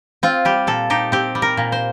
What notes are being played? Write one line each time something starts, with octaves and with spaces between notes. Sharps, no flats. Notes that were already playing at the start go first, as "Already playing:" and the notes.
C4 F4
G3 G4
A#2 A4
D#4 G4
C4 G4
G3
A#4
A#2
C5